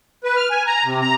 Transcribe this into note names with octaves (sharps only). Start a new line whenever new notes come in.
B4
F6
G#5
A#5
C3
A#5